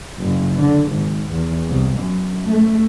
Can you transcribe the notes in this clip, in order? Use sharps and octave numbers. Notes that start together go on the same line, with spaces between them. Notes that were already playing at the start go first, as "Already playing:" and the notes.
F#1
D3
G#1
E2
C2
F#2
A3